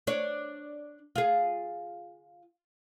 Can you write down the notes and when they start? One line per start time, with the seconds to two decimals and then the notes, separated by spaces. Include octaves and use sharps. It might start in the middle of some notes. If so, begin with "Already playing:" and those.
0.07 D4 C#5
1.16 F4 G#4